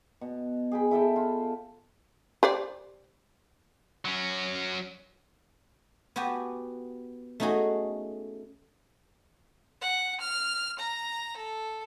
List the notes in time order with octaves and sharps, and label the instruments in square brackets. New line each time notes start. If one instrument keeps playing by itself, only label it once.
[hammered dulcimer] B2
G#4 G5 B5
E4 A4 G5 A5
F4
[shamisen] G4 C5 D5
[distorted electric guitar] F#3 C#4
[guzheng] B3 F#4 G4 G#5 A5
A3 C#4 D#4 F#4 G#4
[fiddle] F#5
F6
A#5
A4